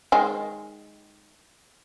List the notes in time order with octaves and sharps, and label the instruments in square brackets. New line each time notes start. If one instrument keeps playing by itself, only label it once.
[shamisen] D#3 G#3